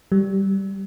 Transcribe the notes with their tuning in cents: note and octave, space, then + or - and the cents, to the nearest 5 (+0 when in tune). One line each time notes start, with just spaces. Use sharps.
G3 -10